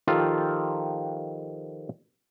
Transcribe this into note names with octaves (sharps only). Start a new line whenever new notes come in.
D#3 F3 F4 G4 A4